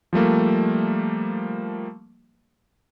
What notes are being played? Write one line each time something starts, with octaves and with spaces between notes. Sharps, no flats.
F3 G3 A3 A#3